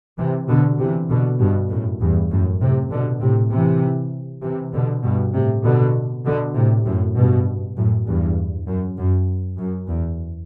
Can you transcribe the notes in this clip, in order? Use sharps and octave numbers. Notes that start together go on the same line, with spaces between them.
C3 E3
B2 D3
C3 E3
B2 D3
G2 B2
F#2 A2
E2 G2
F#2 A2
A2 C3
B2 D3
A2 C3
C3 E3
C3 E3
B2 D3
G2 B2
A2 C3
B2 D3
B2 D3
A2 C3
F#2 A2
G2 B2
F#2 A2
E2 G2
F#2
F#2
F#2
E2